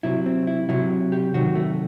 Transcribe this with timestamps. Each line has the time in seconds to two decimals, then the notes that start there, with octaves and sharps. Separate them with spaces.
0.03 C3 F#3 E4
0.26 C4
0.47 E4
0.69 C3 F#3 E4
1.12 G4
1.34 C3 D#3 F#3 F#4
1.55 A3